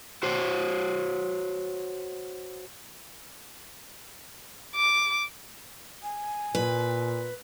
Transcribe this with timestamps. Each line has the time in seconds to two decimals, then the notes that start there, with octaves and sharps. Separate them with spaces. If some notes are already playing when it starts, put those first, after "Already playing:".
0.23 F#4 C5 C#5
4.75 D6
6.03 G#5
6.55 A#2 B4